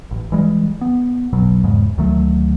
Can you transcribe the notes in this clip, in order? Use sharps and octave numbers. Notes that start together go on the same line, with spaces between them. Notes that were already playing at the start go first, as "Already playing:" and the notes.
A1
E3 G3 G#3
B3
F#1 B1 B2 F#3
E2 G#2 C#3 G#3
D2 D#3 F#3 A3